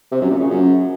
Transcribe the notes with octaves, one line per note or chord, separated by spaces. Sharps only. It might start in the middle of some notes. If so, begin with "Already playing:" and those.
C3
F#2
A#2
C#3
F#2